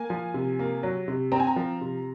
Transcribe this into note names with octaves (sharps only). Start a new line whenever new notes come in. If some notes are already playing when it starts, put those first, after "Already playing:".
Already playing: A#3 G#5
F3
C3
A#3
F#3
C3
C4 A#5
G#5
A#5
F3
C3